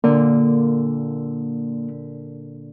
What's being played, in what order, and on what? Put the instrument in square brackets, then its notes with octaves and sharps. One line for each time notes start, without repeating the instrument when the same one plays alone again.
[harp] A#2 D3 [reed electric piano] A#3